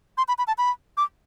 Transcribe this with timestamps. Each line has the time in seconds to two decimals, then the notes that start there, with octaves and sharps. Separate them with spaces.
0.18 C6
0.28 B5
0.38 B5
0.47 A5
0.58 B5
0.97 D6